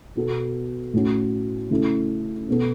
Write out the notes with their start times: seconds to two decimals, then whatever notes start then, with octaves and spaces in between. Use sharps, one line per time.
0.16 B2 B3 F#4 A4
0.93 A2 A3 C#4 F#4
1.71 C#3 A3 E4 A4
2.48 B2 B3 A4